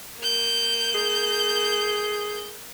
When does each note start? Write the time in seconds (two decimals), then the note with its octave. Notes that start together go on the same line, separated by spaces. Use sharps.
0.19 A#3 G6
0.94 G#4